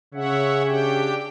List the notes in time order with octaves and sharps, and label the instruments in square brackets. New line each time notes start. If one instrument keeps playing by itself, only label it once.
[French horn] C#3 [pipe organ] C#5 E5 F#5
[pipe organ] D4 G4 G5